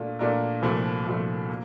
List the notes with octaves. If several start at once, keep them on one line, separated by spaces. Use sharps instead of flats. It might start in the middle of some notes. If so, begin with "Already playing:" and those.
Already playing: A#2 A3 D4 F4
A#2 A3 D4 F4 A#4
C2 A#2 F3 A3
C2 A#2 F3 A3
A#3